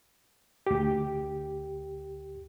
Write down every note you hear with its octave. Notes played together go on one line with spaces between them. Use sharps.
D2 G4